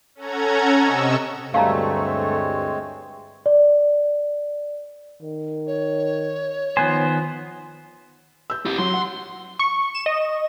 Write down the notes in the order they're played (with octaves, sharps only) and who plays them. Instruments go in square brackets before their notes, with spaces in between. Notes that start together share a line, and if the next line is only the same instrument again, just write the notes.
[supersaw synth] C#4 A4 F#5 A#5 G#6
C3 D#5 C#6 E6
[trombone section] D2 G2 [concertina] G#3 C4 C#5 [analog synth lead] A3 [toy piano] F5 A#5
[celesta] D5
[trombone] D#3
[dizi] C#5
[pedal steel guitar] D#3 B3 C5 [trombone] F3 [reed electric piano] G#5
[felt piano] E6 G6
[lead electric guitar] E4 G4
[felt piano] F#3 [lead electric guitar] C6
[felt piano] F#5
[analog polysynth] C#6
E7
D#5